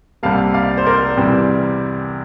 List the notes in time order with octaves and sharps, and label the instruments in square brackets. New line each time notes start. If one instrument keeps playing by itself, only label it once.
[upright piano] C2 C3 G3 A#3 F5 A5
D5 F5
C5
A#4 D5
E2 C3 E3 G3 C4